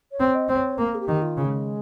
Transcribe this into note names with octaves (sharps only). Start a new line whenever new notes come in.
C#5
C4
D#5
C4 C5
C#5
A#3 A#4
G#4
G4
D#3
F4
C#3
G#3